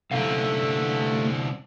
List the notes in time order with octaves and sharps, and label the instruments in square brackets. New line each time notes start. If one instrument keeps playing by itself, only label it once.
[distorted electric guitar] C2 D3 [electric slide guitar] A3 A4 F5